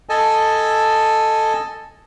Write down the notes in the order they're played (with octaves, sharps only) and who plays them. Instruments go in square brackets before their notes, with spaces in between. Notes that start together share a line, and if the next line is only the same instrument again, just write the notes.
[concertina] A4 D#5 G#5 A5